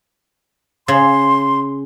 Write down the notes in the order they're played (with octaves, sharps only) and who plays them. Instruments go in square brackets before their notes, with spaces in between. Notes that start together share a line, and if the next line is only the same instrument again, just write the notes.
[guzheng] C#3 [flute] C6